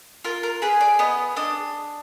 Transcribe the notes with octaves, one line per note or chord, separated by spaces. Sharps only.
F4 A#4
A#4
G#4 B4
D5
B3 D#5
D4 D#5